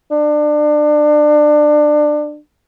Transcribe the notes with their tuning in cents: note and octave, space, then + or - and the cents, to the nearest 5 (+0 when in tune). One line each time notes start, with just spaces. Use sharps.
D4 +25